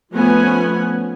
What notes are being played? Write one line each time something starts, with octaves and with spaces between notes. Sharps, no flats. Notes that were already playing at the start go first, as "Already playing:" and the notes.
F3 A3 B3 C#4 F#5 G#5